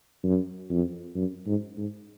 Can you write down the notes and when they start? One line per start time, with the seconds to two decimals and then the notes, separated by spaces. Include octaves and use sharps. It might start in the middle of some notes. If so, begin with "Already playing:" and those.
0.23 F#2
0.70 F2
1.15 F#2
1.46 G#2
1.77 G#2